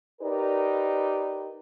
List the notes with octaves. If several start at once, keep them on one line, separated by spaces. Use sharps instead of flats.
D#4 G4 A#4 B4 D5